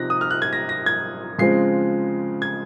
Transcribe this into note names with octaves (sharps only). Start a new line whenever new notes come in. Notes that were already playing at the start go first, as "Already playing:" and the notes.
Already playing: C3 F3 C4 D#4 F#6 A#6
D#6
F6
F#6
G#6
A#6
A#6
G#6
C#3 F3 G#3 C4 C7
G#6